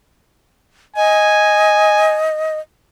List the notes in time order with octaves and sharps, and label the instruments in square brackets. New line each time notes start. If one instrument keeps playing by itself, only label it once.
[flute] D#5 [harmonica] G#5